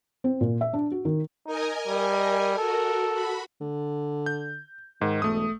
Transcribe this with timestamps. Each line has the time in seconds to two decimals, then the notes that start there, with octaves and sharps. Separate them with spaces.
0.24 C4
0.41 A#2
0.61 E5
0.73 D4
0.92 F#4
1.05 D#3
1.47 D#4 A#4 D#5 G#5
1.88 G3
2.58 F#4 A4 A#4
3.13 F#4 B5
3.61 D3
4.26 G6
5.01 G#2 D#3
5.22 E1 A3 D#6